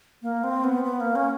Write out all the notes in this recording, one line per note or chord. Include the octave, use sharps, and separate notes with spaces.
A#3
C4
B3
B3
A#3
C#4